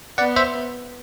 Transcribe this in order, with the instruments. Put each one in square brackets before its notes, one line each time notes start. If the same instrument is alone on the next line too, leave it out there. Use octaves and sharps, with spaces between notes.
[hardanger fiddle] B3 [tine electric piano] D5 F#5
[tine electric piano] C5 E5